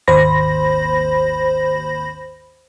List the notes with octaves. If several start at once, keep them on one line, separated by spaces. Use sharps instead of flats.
G#1 D#2 C5 B5 A#6